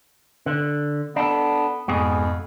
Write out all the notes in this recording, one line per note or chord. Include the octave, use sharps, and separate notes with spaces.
D3
B3 D4 A4
F2 G#2 B2 G#4